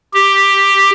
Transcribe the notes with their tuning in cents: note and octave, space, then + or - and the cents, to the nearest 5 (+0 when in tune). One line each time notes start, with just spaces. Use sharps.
G4 +5